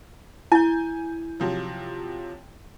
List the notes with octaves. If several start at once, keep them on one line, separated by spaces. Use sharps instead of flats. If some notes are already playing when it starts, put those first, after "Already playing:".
E4 G#5 G6
C3 F3 F#3